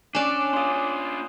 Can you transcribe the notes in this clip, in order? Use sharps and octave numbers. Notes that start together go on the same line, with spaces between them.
C#4 D4 D5 D6 F#6 E7
D4 F4 C6 D#6